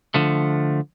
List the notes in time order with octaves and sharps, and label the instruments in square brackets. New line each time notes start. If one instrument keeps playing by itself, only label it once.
[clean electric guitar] D3 F3 A3